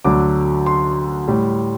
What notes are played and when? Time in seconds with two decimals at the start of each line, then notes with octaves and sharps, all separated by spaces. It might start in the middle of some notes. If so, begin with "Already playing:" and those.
0.05 D2 D3 F#3 D6
0.66 C6
1.28 A2 G3